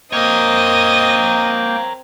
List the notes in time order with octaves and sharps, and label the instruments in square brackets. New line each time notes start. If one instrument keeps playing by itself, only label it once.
[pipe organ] A#3 G5 [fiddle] C4 [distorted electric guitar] A#4 C#5 [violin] D#5